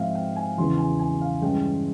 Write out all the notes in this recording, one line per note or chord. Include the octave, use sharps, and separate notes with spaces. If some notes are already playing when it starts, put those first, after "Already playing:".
Already playing: G#2 F3 C4 E5 F5
G5
G#5
E2 C#3 E3 C6
G#5
G#5
F5
G2 E3 G#3 C#4 G5